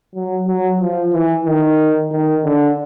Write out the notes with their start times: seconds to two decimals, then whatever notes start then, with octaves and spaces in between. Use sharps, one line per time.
0.15 F#3
0.47 F#3
0.80 F3
1.13 E3
1.46 D#3
2.11 D#3
2.44 D3